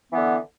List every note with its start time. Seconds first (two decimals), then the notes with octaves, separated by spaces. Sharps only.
0.10 E3
0.13 B3
0.16 D3